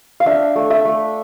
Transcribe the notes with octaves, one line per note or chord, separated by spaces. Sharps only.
F5
D4 E5
A3
E5
A3